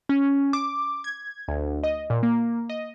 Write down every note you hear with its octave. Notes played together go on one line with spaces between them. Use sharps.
C#4
D6
G#6
D2
D#5
A#2
A#3
D#5